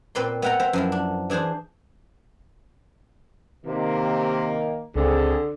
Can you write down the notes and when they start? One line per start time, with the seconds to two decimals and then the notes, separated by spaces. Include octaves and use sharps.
0.15 A#2 C4 B4 D5 C6
0.42 B3 E5 F#5 G5 A#5
0.60 C5 E5 G5 A#5
0.73 F#2 F3 E4
0.92 D4
1.30 E3 D4 G#4 C5 A5
3.66 C3 D#3 A#3
4.96 C#2 D3 C4 G#4 A4